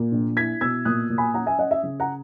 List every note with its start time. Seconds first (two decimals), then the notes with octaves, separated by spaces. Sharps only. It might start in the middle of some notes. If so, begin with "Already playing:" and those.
Already playing: A#2
0.12 A#1
0.36 E4 G#6 B6
0.61 B2 E6 G#6
0.85 A#2 D#6 F#6
1.10 A#2
1.18 G#5 B5
1.34 C#4 F#5 A#5
1.46 E5 G#5
1.59 C#4 D#5 F#5
1.71 E5
1.83 C#3
2.00 F#5 A#5